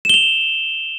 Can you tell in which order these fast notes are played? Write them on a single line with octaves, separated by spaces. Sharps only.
E7 G7 F7